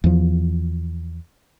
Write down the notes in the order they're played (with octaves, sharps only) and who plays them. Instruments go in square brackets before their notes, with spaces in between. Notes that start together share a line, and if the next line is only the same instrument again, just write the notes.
[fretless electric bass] E2 F3